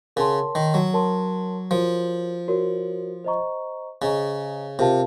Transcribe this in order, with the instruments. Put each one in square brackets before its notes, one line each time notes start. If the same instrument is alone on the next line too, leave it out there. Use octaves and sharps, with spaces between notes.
[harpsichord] C#3 [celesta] A#4 C#5 F#5 A5 C6
[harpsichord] D#3
F#3
[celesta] A#4 C#5 F#5 A5 C6
[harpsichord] F3 [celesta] F#4 A#4 C#5
[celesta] F#4 A#4 C#5
C5 D#5 A#5 C#6
[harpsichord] C#3 [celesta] C5 D#5 A#5 C#6
[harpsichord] C3 [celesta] F4 A#4 F5 A5